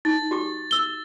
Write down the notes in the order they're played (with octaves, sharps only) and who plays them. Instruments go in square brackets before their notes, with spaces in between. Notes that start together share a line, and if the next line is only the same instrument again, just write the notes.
[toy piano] D#4 [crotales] A6
[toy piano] F#4 G4 D6
[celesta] E6 G7